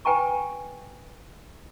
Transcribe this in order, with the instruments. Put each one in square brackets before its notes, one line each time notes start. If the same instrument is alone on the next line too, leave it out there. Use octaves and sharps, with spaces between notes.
[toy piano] B4 G5 G#5 A#5 C#6